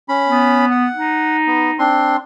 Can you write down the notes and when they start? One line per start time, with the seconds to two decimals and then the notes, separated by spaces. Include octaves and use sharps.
0.09 C#4 B5
0.28 B3
0.71 F#5
0.95 D#4
1.47 B3
1.79 C4 D4 C6